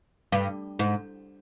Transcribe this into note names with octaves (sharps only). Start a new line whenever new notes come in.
G2
G#2